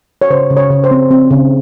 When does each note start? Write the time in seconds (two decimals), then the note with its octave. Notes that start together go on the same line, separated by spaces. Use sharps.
0.22 C#5
0.30 C#3 C5
0.50 C#3
0.57 C#5
0.70 C#3
0.84 C5
0.91 C4
1.11 C4
1.31 C#3